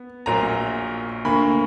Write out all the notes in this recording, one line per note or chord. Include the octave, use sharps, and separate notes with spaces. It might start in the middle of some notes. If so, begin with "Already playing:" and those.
Already playing: B3
A#1 A#2 F#3 A#3 A#5
D2 D3 A#3 B5